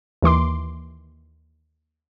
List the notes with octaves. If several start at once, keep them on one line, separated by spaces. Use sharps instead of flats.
D#2 E3 C6 D6